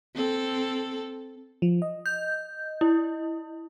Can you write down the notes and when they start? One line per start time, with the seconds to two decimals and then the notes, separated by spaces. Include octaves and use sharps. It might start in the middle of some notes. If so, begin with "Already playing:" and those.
0.14 C4 A4
1.62 F3
1.82 D#5
2.06 G6
2.81 E4